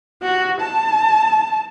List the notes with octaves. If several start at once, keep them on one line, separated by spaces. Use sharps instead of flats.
F#4
A5